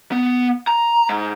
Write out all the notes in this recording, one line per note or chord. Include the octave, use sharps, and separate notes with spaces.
B3
A#5
G#2